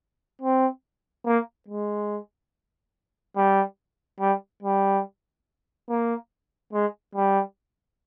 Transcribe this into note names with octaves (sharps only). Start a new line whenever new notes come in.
C4
A#3
G#3
G3
G3
G3
A#3
G#3
G3